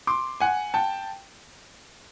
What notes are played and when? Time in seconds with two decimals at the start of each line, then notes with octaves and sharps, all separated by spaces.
0.07 C6 D6
0.40 F#5 G#5
0.74 G5 A5